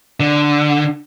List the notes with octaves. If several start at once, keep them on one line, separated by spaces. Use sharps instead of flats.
D3